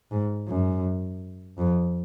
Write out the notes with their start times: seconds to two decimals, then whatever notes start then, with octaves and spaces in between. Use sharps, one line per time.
0.11 G#2
0.48 F#2
1.58 F2